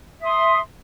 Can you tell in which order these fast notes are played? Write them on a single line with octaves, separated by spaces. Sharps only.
E5 D#6 C6